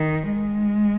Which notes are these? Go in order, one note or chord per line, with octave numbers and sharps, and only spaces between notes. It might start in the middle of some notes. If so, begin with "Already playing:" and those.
Already playing: D#3
G#3